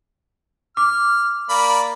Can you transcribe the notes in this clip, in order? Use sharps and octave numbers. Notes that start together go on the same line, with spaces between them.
D6 F6
A#3 D5 B5